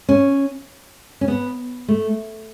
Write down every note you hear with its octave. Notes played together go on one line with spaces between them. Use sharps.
C#4
C#4
B3
A3